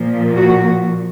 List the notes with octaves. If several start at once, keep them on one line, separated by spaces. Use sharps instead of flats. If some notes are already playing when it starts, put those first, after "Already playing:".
Already playing: A#2 F3
F#4